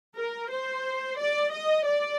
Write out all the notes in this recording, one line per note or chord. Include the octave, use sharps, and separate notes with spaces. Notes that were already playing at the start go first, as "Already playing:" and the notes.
A#4
C5
D5
D#5
D5